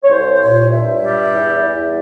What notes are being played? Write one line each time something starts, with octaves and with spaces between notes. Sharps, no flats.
C#5
C2 C5
C5
A#2 C#5
G2 E5
G3
E2
E2